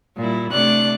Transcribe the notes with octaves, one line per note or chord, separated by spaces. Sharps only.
A#2 G3 E4
C3 A3 D4 D5 F#6